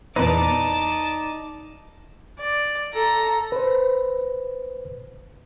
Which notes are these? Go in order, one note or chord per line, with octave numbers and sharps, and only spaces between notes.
E2 A#2 D#4 B4 D5 A5 D6
D5
A4 A#5
B4 C5